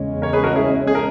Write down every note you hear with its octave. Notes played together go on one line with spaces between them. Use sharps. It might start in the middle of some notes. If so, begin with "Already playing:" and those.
Already playing: E2 C#3 G#3 C#4
A#4 C#5
G#4 B4
F#4 A#4
E4 G#4
G#4
A#4